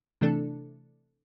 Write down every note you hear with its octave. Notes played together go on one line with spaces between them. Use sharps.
C3 E3 A3 D4 A4